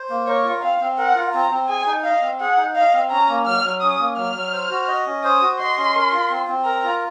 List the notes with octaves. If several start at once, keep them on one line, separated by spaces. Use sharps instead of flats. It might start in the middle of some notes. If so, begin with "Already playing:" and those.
Already playing: C5
A#3
A#4 C#5
F4
C4 F5
C4
A#4 F#5
F4
C4 A#5
C4
G#4 G#5
D#4
D#5 F5
C4
G#4 F#5
D#4
D#5 F5
C4
C#4 A#5
A#3
F#3 F6
F#3
C#4 D#6
A#3
F#3 F6
F#3
C5
F#4
D#5
C#4
C5 D#6
F#4
D#5 C6
C#4
A#4
F4
C4
C4
A#4 A#5
F4